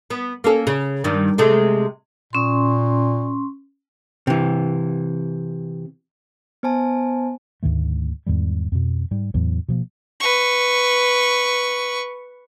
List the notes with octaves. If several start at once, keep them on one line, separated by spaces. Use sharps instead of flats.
B3
A#3 C#4 A4
C#3
G2 D#3
C3 G#3 A3
A#2 C#4 C6
C3 E3
B3 C5 G#5 A5
D2 G#2 D#3 A3
E2 G#2 D#3 G3
F2 B2
G#2 G3
E2 A2 E3 F#3
B2 F3 A#3
B4 C#6